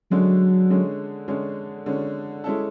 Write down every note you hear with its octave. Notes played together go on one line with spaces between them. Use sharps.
D3 F#3 G#3 C#4
D3 G#3 C#4
D3 G#3 C#4
D3 G#3 C#4
G#3 C#4 E4 A4